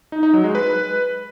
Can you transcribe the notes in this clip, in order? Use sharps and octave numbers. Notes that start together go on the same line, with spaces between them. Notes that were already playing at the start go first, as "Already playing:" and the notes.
D#4
D#4
F#3
G#3
B4